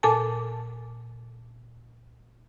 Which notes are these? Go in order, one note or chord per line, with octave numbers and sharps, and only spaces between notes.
A#2 A4 G#5 A5